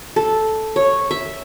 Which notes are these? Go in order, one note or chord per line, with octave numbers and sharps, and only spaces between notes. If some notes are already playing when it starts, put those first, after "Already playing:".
A4
C#5
E5